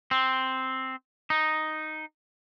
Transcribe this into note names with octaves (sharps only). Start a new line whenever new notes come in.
C4
D#4